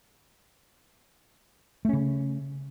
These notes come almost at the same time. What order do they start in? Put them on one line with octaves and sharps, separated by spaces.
A3 C#4 C#3